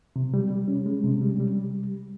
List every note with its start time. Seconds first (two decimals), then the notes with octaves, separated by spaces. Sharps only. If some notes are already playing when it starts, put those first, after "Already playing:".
0.16 C3
0.34 G3
0.51 G3
0.68 C#4
0.86 G#3
1.04 C3
1.21 G3
1.40 G3